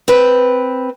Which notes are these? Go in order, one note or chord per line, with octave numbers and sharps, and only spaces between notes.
C4 B4